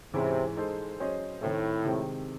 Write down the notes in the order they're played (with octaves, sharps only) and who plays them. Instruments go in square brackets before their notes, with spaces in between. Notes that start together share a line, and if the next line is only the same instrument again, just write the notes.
[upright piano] G#2 E3 G#3 C#4 E4 [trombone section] C3
[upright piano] G#3 D#4 A4 C5
F#3 C#4 G#4 C5 D#5
[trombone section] A2 [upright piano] D#3 A3 C4 E4 A4
[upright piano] C3 D#3 G#3 C4